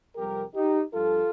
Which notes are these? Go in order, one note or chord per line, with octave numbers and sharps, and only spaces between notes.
F2 C3 G3 G4 A#4
D#4 G4
G2 F3 F4 A4